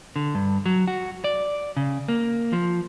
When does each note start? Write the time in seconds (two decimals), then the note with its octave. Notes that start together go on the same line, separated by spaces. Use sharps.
0.16 D3
0.35 G2
0.66 F#3
0.88 F#4
1.24 D5
1.77 C#3
2.08 A#3
2.53 F3